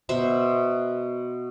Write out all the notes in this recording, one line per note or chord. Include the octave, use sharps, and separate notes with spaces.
B2 C5 E5